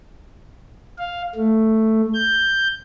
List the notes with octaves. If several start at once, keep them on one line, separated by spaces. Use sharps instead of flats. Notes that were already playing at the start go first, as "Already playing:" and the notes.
F5
A3
G6